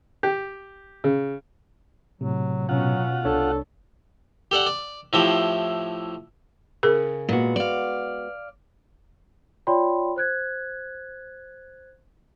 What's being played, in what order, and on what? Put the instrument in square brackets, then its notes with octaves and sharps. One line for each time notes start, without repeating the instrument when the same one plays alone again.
[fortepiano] G4
C#3
[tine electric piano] A2 C3 [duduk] F#3
[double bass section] B2 C#4 [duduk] F#3 [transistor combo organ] F4 F#5
[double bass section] C2 [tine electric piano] D4 C#5 [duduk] A4
[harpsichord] G4 A4 D5 F#5
D5
A2 F3 E4 G4
[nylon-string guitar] C#3 [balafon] G#4 A#4
[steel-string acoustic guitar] A#2 [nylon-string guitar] G#3 B3 F#4
[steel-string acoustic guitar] D5 F5
[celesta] F4 C#5 D5 G5 B5 C6
C5 F#6 G#6